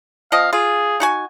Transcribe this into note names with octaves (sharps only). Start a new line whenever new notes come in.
F3 C4 D#5 F5
F4 G#4
D#4 F#4 G#5